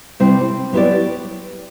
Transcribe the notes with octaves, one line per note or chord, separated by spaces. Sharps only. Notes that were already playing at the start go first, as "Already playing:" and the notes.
C3 G3 C4 E4
F#3 B3 E4 G4 D5